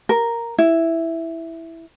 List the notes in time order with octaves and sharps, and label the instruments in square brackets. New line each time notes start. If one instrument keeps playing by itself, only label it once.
[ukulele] A#4
E4